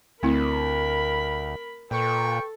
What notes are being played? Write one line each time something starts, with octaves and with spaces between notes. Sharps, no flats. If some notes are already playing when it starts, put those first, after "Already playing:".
D2 A3 C4 E4 A#4 B5
A#2 A4 B4 G5 C#6